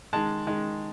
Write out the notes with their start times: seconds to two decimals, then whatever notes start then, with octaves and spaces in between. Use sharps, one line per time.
0.13 D#3 G#3 A5
0.47 D#3 G#3